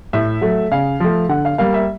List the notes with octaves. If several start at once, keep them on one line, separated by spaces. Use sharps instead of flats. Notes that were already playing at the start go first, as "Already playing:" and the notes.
A2 E5
F#3 A3
C#3 F5
F3 A3
D3 F#5
F5
G3 A#3 F5
E5